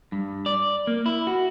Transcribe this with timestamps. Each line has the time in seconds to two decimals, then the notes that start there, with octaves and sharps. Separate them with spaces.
0.12 G2
0.46 D5
0.87 A#3
1.06 E4
1.27 F#4